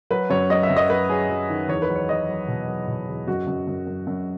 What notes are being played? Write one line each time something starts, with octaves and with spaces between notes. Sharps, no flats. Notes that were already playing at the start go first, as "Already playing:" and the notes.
F#3 B4
F#2 C#5
F#3 D#5
E5
F#2
D#5
F#3 B4
F#3 G#4
F#3
D#3
E2 C#5
B4
F#3
C#5
F#3 D#5
F#3
B2
F#3
B2
E2
F#2 F#4
F#2
F#2
F#2
F#2